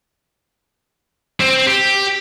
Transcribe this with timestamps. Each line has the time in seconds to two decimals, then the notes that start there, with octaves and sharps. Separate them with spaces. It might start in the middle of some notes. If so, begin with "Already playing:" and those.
1.40 C4 C5
1.67 G4